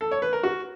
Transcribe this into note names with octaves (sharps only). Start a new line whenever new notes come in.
A4
C#5
B4
A#4
F#4